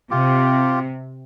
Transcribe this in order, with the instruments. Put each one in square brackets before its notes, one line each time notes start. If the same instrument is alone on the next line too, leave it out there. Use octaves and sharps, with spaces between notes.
[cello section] C3 [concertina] F4 G4